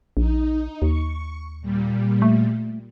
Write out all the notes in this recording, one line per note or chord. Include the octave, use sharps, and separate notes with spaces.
A#1 D#4
D#2 C#6
A#2 G3
A3